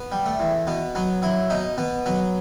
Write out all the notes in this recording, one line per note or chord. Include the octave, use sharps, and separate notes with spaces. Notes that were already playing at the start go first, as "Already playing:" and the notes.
Already playing: B3
G3
A3
E2
B2 B3
F#3 B3
F#3 E4
B2 D#4
B2 B3
F#3 B3